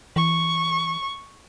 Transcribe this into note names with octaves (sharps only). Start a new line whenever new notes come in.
E3 C#6